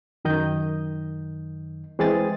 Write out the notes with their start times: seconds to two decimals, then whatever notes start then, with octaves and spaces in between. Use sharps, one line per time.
0.25 F#2 D#3 D#5 G6
1.99 E3 G#3 C4 G#4 D#6 A6